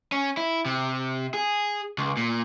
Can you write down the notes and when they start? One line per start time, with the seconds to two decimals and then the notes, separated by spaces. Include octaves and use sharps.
0.12 C#4
0.37 E4
0.65 C3
1.34 G#4
1.98 C#2
2.17 A#2